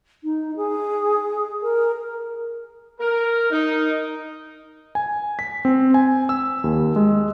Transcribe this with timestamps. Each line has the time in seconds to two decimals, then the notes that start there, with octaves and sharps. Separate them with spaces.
0.24 D#4
0.56 G#4
1.62 A#4
3.00 A#4
3.51 D#4
4.95 G#5
5.39 B6
5.65 C4
5.94 G#5
6.29 E6
6.64 D#2
6.96 G#3